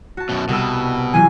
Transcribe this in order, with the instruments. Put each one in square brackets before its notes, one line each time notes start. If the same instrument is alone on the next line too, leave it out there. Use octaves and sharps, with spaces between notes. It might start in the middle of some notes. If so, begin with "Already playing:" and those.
[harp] F#4 A5
[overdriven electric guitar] F#2 B2
[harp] C2 E6 [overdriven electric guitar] B2
[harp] E3 F#3 F4 [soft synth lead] G#5